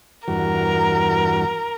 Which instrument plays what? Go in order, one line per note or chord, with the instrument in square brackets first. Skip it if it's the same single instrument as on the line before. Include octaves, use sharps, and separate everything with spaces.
[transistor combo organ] E2 G2 F#4 [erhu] A#4